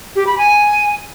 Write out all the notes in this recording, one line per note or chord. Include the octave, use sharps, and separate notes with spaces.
G4
B5
G#5